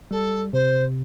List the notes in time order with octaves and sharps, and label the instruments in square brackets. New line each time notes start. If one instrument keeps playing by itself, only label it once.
[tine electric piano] G3 [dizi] A4
[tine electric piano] C3 [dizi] C5